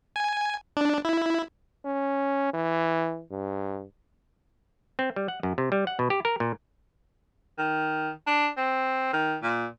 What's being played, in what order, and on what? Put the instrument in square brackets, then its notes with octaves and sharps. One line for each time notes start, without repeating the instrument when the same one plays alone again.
[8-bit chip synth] G#5
D4
E4
[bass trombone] C#4
E3
G2
[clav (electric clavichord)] C4
G3
F#5
F#2
C3
G3
F#5
B2
G4
A#4
A#2
[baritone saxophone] D#3
D4
C4
D#3
A#2